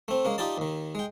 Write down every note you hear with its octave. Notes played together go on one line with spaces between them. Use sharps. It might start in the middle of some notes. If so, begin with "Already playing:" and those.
A3 C4
G#3 A#3 C#4
D#4 F4 G4 D5 A5
D#2 D#3
G#3 G5